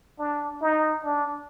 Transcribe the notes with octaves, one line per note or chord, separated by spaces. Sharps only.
D4
D#4
D4